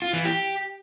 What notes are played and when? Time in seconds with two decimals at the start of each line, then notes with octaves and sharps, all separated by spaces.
0.02 F4
0.13 E3
0.25 G4